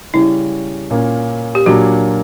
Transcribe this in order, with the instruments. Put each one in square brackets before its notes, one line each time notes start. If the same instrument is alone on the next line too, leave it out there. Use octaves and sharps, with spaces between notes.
[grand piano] C#3 G3 C#4 [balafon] E4
[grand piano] A#2 A#3 C#4
[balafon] G4
[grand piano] A#2 F#3 A#3 D4 [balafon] F#4